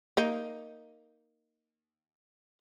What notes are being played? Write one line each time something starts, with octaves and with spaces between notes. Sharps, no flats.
A#3 D#4